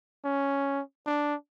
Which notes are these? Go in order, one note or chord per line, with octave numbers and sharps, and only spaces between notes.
C#4
D4